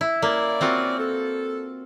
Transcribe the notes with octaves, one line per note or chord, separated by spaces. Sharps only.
E4
A#3 C#4 E4 D5
C4 F4 F#4
A4